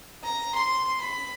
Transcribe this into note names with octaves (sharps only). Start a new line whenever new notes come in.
A#5
C6
B5